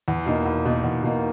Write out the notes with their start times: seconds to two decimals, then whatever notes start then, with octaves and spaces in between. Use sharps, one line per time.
0.08 E2
0.26 B2 A#3 D#4
0.45 E2
0.65 B2 A#3 D#4
0.83 E2
1.03 B2 A#3 D#4